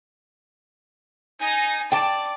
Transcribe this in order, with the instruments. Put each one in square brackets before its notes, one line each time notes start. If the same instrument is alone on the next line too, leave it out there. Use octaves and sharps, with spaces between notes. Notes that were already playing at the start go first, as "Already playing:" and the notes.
[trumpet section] D#4 [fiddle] G#5
[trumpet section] D5 [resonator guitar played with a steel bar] G5 A5 [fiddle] D6